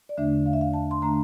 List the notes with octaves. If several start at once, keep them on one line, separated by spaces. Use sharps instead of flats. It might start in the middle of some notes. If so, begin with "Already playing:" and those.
D5
E2 D3 A3 D4 E5
F5
E5
F5
A5
C6
D3 A3 D4 A#5